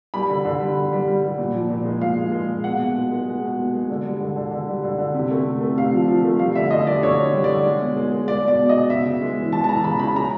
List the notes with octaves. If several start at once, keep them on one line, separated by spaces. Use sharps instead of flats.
G3 B5
D3
D3
G3
D3
G3
G3
G3
A#2
F3
A#2
G#3
A#2 F5
G#3
G#3
A#2
B2 F#5
B2
G#3
G#3
G#3
B2
G#3
G#3
D3
G3
D3
D3
D3
G3
D3
D3
C3
A3
C3
A3
C3 F5
F3
F3
A3
G3 F5
D3 E5
D3 D#5
G3 D5
D3 C#5
D3
G3
D3 D5
G#3
B2
G#3
G#3
G#3 D5
B2
D5
B2
D#5
B2
C#3 E5
C#3
G#3
E3
G#3 A5
A5
E3 A#5
C#3 B5
C#3 B5
G#3 A#5